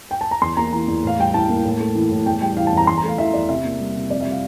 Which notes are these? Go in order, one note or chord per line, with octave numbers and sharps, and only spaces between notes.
G5
A5
A#5
E2 C6
A#3 A#5
E3 A#5
E2
A2 F5
G3 G5
E3 A5
A#3
A2
A3
E3
A2
E2 G5
G3 G5
E3 F5
A5
E2
A#5
E2 C6
A#5
A3 F5
E3 E5
E2 D5
C3 E5
A#3
G3
C3
F2 D5
G3 E5
F5